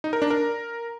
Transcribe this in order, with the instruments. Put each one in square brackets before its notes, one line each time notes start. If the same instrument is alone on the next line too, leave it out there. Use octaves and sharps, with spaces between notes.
[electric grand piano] D#4
A#4
D4
A#4